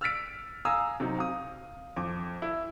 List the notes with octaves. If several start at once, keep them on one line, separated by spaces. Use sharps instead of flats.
E6 F6 A6 B6 D7
F5 G#5 A#5 D#6 E6
C3 F#3 D#4
F5 D#6
F2 D6
E4